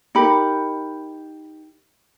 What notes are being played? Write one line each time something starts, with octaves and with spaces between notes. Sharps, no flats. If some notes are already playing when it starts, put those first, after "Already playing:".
D#4 G4 A#4 B5